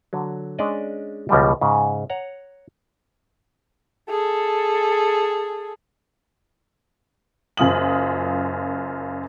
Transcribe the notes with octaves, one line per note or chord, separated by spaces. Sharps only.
D3 F#3
G#3 C#4 D4 D5 D#5
C#2 B2 F3 G3
G#2 C#3
C#5 F#5 A#5
G#4 A4
F#1 F#2 F4 D#6 F#7